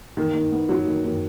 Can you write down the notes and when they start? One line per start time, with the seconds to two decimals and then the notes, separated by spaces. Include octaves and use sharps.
0.17 D#3
0.34 D#3
0.52 B3
0.69 F#3
0.87 D#3
1.04 D#3